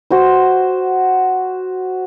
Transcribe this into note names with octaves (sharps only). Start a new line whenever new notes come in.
F#4 C5 C6